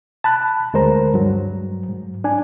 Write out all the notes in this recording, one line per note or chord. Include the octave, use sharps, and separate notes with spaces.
A5 B5 F#6
D2 G#3 A#4 C5 A#5
G2 F#3
G#2
D4 G#5